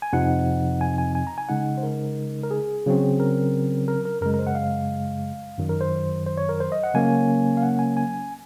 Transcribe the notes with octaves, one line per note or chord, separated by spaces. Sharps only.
G#5
F2 C3 F3 C4 D#4 F#5
G#5
G#5
G#5
A#5
G#5
C#3 G#3 D#4 F#5
C5
A#4
A#4
G#4
C#3 F#3 C4
A#4
A#4
A#4
F#2 C#3 G#3 A#4
A#4
C5
F#5
F5
F#2 D#3 F#3
A#4
C5
C5
C#5
A#4
C5
D#5
F#5
C#3 F#3 A#3 C#4 G#5
F5
F#5
G#5
G#5